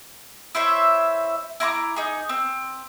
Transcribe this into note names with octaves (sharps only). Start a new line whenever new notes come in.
E4 C5 C#5 E5
E4 A#5 C6 D6
D#4 G#4
C4